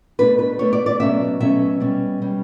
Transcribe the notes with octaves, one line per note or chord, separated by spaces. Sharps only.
B2 A3 D4 B4
B4
B2 A3 D4 C#5
D5
D5
B2 F#3 A3 C#4 E5
B2 F#3 A3 C#4 E5
B2 G3 C#4
B2 G3 C#4